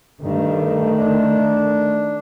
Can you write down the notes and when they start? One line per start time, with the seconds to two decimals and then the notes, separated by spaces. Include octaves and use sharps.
0.21 G2 D#3 A3
0.97 D4